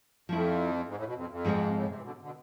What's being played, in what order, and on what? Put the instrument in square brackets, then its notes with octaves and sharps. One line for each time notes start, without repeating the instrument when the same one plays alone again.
[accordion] F2 [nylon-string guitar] F3 A3 E4
[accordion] G#2
A2
B2
F2
F2
[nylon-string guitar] G#2 F3 G#3 C4 F4
[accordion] A2
C3
E3
B2 D3
B2 D3